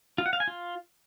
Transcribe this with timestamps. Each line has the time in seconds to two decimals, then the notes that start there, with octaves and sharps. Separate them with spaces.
0.18 F4
0.26 F#5
0.33 F5
0.40 G#5
0.48 F4